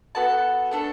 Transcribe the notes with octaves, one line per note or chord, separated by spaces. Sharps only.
B3 F#4 A4 A5
A3 D4 A4